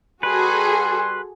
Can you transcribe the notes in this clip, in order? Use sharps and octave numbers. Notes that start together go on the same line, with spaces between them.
G3 F#4 G#4 A4 B4 C6